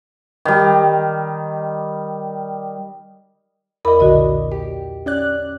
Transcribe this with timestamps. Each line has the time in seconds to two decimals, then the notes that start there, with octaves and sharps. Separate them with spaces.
0.45 D#3 G3
3.85 E2 A#4 D5 D#5 B5
4.00 B1 A#2 D3 F#4 D#5
4.51 G4
5.06 C#4 D5 F#6